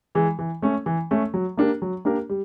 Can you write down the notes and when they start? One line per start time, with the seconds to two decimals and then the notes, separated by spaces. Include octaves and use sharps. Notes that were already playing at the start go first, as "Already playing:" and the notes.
0.15 E3 G#3
0.39 E3
0.62 A3 C#4
0.86 E3
1.11 A3 C#4
1.34 F#3
1.57 A#3 D4 G4 A#4
1.82 F#3
2.05 A#3 D4 G4 A#4
2.30 G3